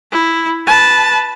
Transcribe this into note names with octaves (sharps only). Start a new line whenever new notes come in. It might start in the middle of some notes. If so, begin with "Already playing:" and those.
E4
B4 A5